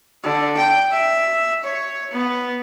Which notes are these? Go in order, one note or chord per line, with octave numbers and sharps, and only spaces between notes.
D3
G5
E5
C#5
B3